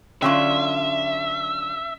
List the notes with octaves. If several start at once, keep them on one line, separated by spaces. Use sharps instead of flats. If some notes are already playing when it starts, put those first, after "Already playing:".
D3 F#3 C#4 F4 E5 C6 C#6